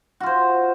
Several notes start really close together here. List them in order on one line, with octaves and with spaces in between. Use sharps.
F#4 F4 C5